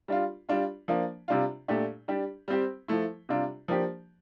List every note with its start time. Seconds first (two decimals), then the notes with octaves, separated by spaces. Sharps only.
0.08 G3 D4 F4
0.49 G3 D4 F4
0.88 F3 A#3 D4
1.28 C3 G3 D4 F4
1.68 A#2 A3 D4 G4
2.08 G3 D4 G4
2.48 G3 C4 G4
2.88 F3 A3 E4
3.29 C3 G3 D4 F4
3.68 F3 A#3 D4 G4